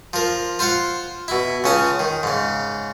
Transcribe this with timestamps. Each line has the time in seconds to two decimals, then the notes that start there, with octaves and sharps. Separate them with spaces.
0.13 F3 A#4
0.59 F4 C5 F5 F#5
1.28 B2 E4
1.64 C#2 C#3 C#4 A5 D#6
1.99 D#3
2.23 G#2 C#3